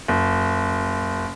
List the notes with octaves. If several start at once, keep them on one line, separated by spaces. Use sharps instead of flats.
F#1